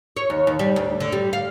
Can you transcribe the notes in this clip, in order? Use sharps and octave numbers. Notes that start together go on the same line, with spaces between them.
C#5
D#2
D#2
G3
D2
D3
G3
F5